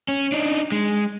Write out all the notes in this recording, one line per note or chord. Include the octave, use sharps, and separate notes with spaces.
C#4
D4 D#4
G#3